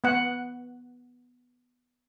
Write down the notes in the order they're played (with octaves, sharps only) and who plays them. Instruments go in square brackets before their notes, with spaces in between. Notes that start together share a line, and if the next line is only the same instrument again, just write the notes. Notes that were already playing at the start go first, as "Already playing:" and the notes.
[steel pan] B3 F#5